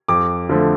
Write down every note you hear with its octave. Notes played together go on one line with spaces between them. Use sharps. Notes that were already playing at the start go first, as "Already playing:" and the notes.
F2 D6
D3 F3 A3